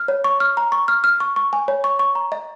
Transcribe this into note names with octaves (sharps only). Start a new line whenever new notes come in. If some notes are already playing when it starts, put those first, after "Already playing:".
Already playing: F6
C#5
C#6
F6
A#5
C#6
F6
F6
C#6
C#6
G#5
C#5
C#6
C#6
A#5
D#5